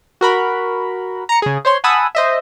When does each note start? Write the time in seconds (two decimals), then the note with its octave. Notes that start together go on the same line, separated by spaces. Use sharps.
0.21 F#4 A#4 B5
1.29 A#5 C#7
1.42 C#3 G#4
1.65 C5 C#5 C6
1.84 F#5 G#5 A5 B5 D#6 E6
2.15 C5 D#5 E5